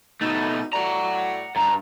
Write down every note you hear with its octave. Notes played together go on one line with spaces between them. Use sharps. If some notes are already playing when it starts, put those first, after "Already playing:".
B2 A3 D#4
A2 F#4 D5 F#5 A#5
G2 A#5